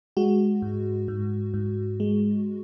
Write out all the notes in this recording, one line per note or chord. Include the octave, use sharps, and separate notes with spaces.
G#3 F#4
G#2
G#2
G#2
G#3